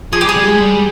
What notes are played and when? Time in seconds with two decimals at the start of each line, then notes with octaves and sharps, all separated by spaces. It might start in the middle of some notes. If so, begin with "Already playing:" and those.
0.13 F3 G#4
0.21 G4
0.24 G3
0.29 G#4
0.36 G3
0.48 G#3
0.60 G3